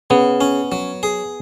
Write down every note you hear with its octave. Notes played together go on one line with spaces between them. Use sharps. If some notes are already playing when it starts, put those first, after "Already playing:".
C#3 B3
C#4
F#3
G#4